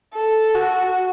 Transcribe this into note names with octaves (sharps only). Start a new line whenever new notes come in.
A4
F#4